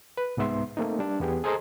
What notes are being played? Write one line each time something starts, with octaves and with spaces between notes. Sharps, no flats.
B4
C2 G#2 B3 E5 C6
A3 A#3 C4 D#4
G3 D4
E2 B3 G4 G#4
G#4 A4 C5 D#5 A#5 C6